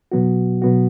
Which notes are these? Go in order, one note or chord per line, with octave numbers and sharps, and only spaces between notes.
B2 F#3 B3 F#4
B2 F#3 B3 F#4